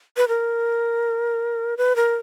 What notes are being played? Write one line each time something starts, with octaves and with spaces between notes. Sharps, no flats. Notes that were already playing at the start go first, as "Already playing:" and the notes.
B4
A#4
B4
A#4